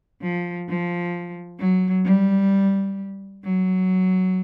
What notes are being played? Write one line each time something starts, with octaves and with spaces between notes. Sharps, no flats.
F3
F3
F#3
G3
F#3